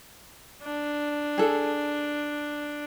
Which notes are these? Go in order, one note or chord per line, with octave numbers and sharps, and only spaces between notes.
D4
G#4 A4